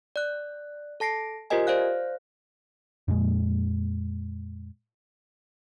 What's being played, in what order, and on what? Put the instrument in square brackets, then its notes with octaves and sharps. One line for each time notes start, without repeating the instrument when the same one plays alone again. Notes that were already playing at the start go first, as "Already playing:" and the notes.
[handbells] D5 F#6
A4 A5 A#6 C7 D7
F4 G4 A#4 C5 D#5 G#5
C5 D5 F5 F#6
[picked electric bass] F2 A#2 G#3